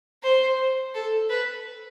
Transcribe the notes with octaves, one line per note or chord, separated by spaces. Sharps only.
C5
A4
B4